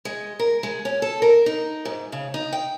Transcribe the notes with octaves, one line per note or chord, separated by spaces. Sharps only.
G#3
A#4
G#3
C#4
A4
A#4
D#4
G#2
C#3
D#4
G5